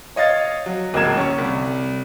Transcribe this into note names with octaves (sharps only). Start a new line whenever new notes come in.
C#5 D#5 F5 A6
F#3
D1 C#2 A#3 A#5 G#6 E7
C#4 C#6
C2